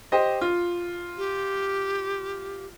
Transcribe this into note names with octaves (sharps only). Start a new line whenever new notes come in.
G4 C5 D#5
F4
G4